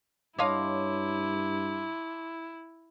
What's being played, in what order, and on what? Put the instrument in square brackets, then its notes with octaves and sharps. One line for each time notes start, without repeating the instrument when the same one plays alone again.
[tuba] G2 [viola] E4 [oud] C#5 D#5 F5 [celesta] A5 C6 D6